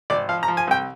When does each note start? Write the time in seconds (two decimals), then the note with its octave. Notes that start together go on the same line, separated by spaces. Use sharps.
0.10 G#1 D5
0.29 F3 F5
0.43 A#5
0.48 F3
0.57 G#5
0.67 C2 G5